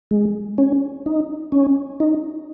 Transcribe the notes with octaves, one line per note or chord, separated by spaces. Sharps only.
G#3
C#4
D#4
C#4
D#4